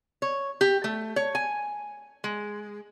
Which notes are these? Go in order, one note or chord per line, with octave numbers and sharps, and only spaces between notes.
C#5
G4
A3
C#5
G#5
G#3